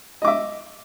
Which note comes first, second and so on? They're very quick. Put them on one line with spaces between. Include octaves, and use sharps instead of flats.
D#5 D6 E5